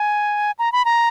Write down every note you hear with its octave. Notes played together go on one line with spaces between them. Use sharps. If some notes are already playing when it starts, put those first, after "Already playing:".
Already playing: G#5
A#5
B5
A#5